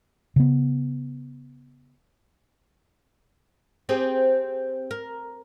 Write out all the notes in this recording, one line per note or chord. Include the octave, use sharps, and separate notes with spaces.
C#3 B3
C4 G4 G#4
A#4